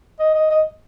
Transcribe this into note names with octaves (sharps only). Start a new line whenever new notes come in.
D#5
D#5
D#5